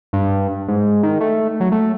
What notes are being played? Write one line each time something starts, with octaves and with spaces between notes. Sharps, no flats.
G2
G#2
D#3
A3
F#3
A3